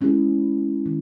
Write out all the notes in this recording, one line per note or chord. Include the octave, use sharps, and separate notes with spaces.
G#3 C#4 E4 G#4
D#3